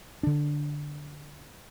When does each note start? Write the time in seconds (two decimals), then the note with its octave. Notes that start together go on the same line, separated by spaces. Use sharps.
0.23 D3 D4